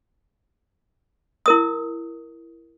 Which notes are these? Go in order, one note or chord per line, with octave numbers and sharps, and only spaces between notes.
E4 A#4 D#6